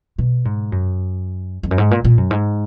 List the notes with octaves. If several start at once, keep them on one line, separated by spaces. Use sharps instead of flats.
B2
G#2
F#2
F2
F#2
G#2
A#2
A#2
F#2
G#2